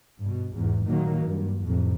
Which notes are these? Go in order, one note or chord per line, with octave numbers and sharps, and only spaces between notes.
G2 B2
E2 G#2
A#2 D#3 F#3 A#3
G2
F2 A2 C3